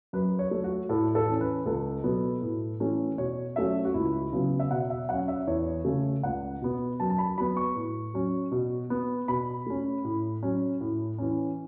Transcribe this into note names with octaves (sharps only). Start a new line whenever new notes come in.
F#2 B4
C#5
F#3 A3
F#4
A2 A4
A4
E3 C#4
B4
C#2 A4
B2 F#3 B3
A2
E3 A3 C#4
B2 C#5
F#3 A3 C#4 E5
F#4
C#2 E4
C#3 F#3 B3
E5
B2 F#5
E5
F#3 C#4 F#5
E5
E2 C#5
C#3 A3 C#4
C#2 F#5
B2 B3
F#2 A5
A5
B5
F#3 B3 B5
C#6
A2
F#3 C#4
B2
B3
B2 B5
A3 C#4
A2
F#3 C#4
A2
E3 C#4